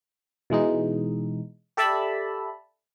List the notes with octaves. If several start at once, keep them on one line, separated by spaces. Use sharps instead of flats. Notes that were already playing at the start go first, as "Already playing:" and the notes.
B2 E3 G#3 D#4
G4 A4 D5 E5 A5 B5